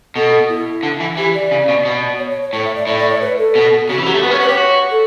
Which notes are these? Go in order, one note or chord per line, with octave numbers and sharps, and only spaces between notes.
B2 A4
E4
D3
E3
E3 G4
D5
C#3
B2
B2
C#5
C#5
C#5
A2 C#5
E5
D5
A2 E5
D5
C#5
B4
A4
B2
C#3 F#4
E3
F#3 G4
A3
B3 B4
C#4 C#5
F#4 B4
G4 C#5
F#4
A4